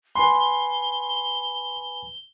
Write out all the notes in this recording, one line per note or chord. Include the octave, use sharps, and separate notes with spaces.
B4 G#5 B5 C6 G7